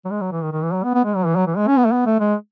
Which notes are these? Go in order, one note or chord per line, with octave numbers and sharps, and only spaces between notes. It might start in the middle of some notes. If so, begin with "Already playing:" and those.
F#3
G#3
F#3
E3
D#3
D#3
E3
F#3
B3
B3
G#3
F#3
E3
F#3
E3
G#3
C#4
B3
A3
B3
A3
G#3